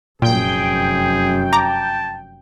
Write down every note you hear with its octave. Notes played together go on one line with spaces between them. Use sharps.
F1 F#2 A#2 G#4 G5
A5 A#5 D6